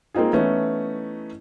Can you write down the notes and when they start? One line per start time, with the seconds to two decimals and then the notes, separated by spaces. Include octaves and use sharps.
0.14 A#3 C4 D#4 F4 G#4
0.33 E3 A3 B3 C#4 D#4 E4